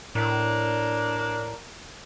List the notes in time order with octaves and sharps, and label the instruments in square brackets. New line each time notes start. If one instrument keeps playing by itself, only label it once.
[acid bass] A2 [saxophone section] A#3 D4